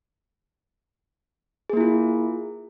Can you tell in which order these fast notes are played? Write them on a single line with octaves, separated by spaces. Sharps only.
G#4 A#3 E4 F4